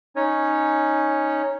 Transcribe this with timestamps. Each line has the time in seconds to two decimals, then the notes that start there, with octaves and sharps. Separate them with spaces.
0.16 C#4 D#4 C#5